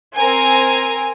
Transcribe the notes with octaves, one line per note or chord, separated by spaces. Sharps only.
C4 A#4 G#5